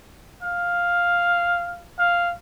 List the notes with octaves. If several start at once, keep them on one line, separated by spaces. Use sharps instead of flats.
F5
F5